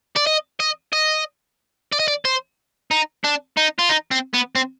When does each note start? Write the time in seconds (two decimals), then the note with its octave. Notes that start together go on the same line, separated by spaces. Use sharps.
0.16 D5
0.27 D#5
0.60 D#5
0.93 D#5
1.92 D5
1.99 D#5
2.08 D5
2.25 C5
2.91 D#4
3.24 D4
3.57 D#4
3.79 F4
3.89 D#4
4.11 C4
4.34 B3
4.56 C4